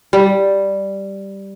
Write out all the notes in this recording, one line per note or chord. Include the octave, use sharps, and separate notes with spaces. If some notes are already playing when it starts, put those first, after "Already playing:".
G3